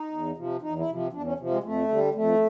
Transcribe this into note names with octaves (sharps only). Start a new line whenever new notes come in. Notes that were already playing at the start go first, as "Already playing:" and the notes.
Already playing: D#4
E2
C3 F3
E2 D#4
E4
C3 F3
E2 D4
C#4
C3 F3
G#3
F2 A3
D3 G3
F2 A3